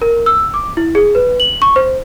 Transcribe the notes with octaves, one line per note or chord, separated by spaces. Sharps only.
A#4
E6
D6
E4
G#4
B4
F#7
C#6
C5